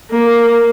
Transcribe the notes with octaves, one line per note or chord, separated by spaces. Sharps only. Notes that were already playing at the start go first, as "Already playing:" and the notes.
A#3